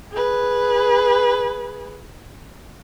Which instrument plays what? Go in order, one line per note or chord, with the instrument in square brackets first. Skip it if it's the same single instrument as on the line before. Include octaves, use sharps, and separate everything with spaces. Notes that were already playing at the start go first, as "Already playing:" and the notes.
[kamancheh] G#4 B4